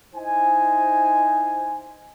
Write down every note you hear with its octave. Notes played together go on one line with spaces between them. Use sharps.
D#4 E4 C5 D#5 G#5